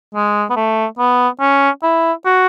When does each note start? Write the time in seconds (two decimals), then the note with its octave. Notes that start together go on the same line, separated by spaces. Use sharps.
0.15 G#3
0.50 B3
0.56 A3
0.99 B3
1.40 C#4
1.83 E4
2.25 F#4